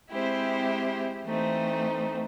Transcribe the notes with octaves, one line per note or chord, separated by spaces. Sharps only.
G#3 C4 E4 G4 C5
E3 A3 C4 D#4